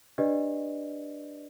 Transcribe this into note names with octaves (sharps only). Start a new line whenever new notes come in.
D4 G4 B4 D5 D#5